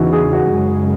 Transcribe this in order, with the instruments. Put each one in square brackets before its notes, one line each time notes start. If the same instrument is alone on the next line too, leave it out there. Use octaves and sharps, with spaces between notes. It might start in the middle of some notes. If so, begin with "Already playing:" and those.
Already playing: [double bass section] E2 C#3 E3 [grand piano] D#4 F#4
[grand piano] G#4
F#4
[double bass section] F#2 C#3 G#3